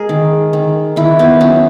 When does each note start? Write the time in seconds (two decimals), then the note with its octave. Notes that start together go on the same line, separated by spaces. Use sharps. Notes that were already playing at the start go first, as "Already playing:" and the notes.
Already playing: G#3 G#4 A#4
0.09 D#3
0.53 D#3
0.96 D#3 E4
1.19 B3
1.40 F#3 C#4